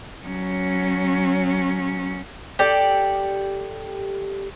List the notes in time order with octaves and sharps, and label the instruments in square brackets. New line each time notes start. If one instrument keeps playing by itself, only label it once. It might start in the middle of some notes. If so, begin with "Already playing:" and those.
[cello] F#3 C#4
[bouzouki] G4 A4 D5